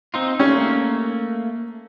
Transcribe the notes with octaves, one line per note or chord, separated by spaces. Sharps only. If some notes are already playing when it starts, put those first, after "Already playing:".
C4 D#4 F4
A3 A#3 C#4